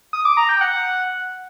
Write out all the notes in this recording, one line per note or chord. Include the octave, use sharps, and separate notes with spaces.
D#6
D6
A#5
G5
F#5